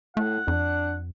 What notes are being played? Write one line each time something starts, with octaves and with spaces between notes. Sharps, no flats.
A2 A3 F#5
F2 D4